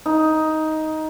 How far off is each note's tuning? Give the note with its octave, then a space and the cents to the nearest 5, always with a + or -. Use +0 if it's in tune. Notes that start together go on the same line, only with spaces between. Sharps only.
D#4 +10